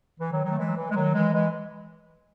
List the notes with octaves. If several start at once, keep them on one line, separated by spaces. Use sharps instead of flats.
E3
D#3 F#3
D#3 F#3
A3
E3 G#3
F#3
E3
G#3
D#3 F#3
E3 G#3
E3 G#3